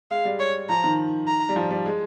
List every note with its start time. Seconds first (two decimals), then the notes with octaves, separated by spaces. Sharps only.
0.11 G#3 F5
0.25 G3
0.39 C#5
0.69 F3 A#5
0.84 D#3
1.27 A#5
1.49 G3
1.56 F3
1.70 G3
1.86 G#3